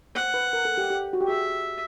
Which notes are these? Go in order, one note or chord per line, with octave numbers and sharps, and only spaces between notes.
C5 F#5
B4
A#4
A4
G4
G4
F#4
G4
G#4 E5